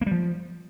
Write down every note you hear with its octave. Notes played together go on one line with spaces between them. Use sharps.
A#3
G3
F3